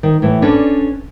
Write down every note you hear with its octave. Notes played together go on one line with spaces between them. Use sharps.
D#3
A2 E3
C#4 D4 A4 B4 D5